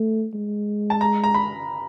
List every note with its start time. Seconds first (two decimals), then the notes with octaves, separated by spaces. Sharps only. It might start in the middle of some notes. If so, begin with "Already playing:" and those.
Already playing: A3
0.34 G#3
0.90 A5
1.01 A#5
1.24 A#5
1.34 B5